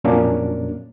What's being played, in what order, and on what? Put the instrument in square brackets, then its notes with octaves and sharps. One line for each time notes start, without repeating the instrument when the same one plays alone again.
[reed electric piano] F2 A#2 F#3 A#3 C#4 D4